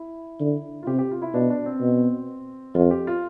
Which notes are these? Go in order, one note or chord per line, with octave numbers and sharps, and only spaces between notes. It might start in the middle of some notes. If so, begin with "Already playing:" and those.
Already playing: E4
D3
F4
C3 G4
G4
F4
E4
B2 D4
D4
C4
B2
F2 F4
G4
F4